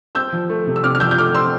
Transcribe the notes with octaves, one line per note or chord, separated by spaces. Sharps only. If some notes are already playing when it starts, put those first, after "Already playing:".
C4 E6 G6
F3
A3
C3
E6
C3 D6 F6
F6
F3 E6 G6
G6
A3 D6 F6
C4 C6 E6